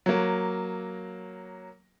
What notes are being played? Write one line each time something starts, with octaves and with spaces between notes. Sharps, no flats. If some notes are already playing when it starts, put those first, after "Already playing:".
F#3 A#3